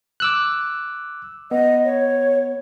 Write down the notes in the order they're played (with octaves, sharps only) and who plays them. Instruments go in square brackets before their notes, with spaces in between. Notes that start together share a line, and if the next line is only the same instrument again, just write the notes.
[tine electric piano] D6 E6 F#6
[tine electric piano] B3 [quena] D#5
[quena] C#5